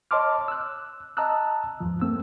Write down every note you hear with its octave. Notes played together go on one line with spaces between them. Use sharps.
C#5 D#5 A5 C6 D6 F6
E6 F#6
D#5 A5 A#5 D#6 E6 F#6
E2 G#2 F3
G2 A3 A#3 C4 E6